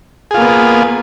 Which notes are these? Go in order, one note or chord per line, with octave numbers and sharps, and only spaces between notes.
A#3 B3 F4 G#4